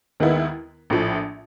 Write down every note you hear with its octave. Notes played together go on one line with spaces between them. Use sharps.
D#2 D#3 G#3 B3 E4
A#1 A2 F3 A3